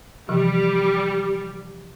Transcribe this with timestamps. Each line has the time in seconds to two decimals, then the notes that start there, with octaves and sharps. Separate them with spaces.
0.29 C3 E3 F3 G3